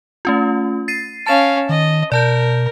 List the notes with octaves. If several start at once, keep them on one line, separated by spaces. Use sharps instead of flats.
A3 C#4 F4
A6 C7 D#7
C#4 F5 A5 A6 E7
D#3 D#5
B2 A#4 D5 A5 G6